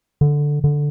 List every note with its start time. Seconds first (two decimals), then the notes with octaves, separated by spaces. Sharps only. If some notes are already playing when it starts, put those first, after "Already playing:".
0.21 D3
0.64 D3